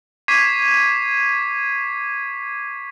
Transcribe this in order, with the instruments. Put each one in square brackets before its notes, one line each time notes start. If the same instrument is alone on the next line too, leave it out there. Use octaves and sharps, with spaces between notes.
[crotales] C#6 D6 G#6 B6 C7 D#7